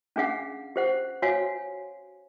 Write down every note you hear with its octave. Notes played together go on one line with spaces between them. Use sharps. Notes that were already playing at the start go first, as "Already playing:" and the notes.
C#4 D4 G#4 F5 F#5
G4 C5 F#5
F#4 C#5 F5 G#5